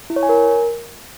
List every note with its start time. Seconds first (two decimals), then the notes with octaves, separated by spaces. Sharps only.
0.10 E4
0.16 C#5
0.23 G#5
0.29 A#4